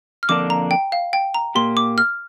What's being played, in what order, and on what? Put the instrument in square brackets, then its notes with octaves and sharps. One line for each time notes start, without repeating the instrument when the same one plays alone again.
[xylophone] F6
[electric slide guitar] F2 D3 A#3 D4 [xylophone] D6
[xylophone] A#5
G5
F5
G5
A#5
[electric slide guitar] A#2 A#3 G4 [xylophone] C6
[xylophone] D6
F6